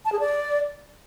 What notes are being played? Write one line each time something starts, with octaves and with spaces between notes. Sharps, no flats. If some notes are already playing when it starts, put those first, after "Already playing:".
A5
G#4
D5